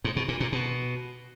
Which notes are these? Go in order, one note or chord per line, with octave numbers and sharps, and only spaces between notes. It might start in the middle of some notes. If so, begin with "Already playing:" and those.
G#2
B2
A#2
A#2
B2